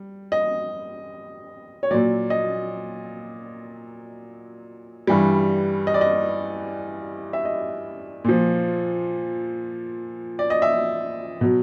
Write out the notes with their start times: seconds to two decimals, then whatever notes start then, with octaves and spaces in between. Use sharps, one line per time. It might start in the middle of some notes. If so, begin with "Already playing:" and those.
Already playing: G3
0.32 D#5
1.83 C#5
1.91 A#2 F#3 D5
2.30 D#5
5.07 G2 E3 G3
5.87 D#5
5.94 D5
6.01 D#5
7.33 E5
7.45 D#5
8.24 A#2 F3
10.39 D5
10.50 D#5
10.62 E5
11.41 B2 F#3